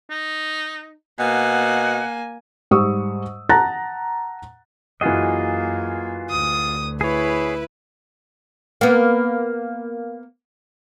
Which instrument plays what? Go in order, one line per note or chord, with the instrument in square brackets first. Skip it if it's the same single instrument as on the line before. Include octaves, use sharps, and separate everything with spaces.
[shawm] D#4
[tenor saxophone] B2 [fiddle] A#3 G#5 [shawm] F#5
[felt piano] G#2 G3 C#6 D#6 E6
F#5 A5 A#5 F#6 A6 A#6
[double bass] F#2 A#3 [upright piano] E3 F#4 [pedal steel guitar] F4 G#4 D#5
[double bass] D2 [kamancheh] D#6
[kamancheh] E4 B4 [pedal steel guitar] G#4 C#5
[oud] A#3 B3